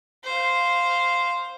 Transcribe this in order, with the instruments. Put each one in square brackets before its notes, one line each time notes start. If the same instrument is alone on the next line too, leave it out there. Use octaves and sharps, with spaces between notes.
[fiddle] C5 F5